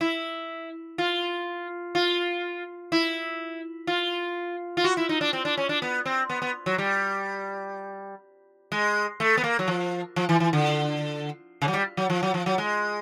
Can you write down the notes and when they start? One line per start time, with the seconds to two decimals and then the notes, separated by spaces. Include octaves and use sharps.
0.01 E4
0.98 F4
1.95 F4
2.92 E4
3.87 F4
4.77 F4
4.84 F#4
4.97 E4
5.09 D#4
5.21 D4
5.33 C4
5.45 D4
5.57 C#4
5.69 D4
5.82 B3
6.06 C4
6.30 B3
6.42 B3
6.66 F#3
6.78 G3
8.72 G#3
9.20 A3
9.37 B3
9.44 A#3
9.59 F#3
9.68 F3
10.16 F3
10.29 E3
10.40 E3
10.53 D3
11.62 C#3
11.68 F#3
11.74 G3
11.97 F#3
12.10 F3
12.23 F#3
12.34 F3
12.46 F#3
12.58 G#3